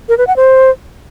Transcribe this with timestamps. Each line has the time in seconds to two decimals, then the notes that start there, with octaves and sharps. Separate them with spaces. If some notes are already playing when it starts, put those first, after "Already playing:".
0.09 A#4
0.18 B4
0.27 F#5
0.36 C5